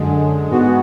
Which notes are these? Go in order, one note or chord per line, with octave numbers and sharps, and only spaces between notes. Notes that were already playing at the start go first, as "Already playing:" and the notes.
Already playing: F#2 D3 G#3
G#2 G#3 B3 F#4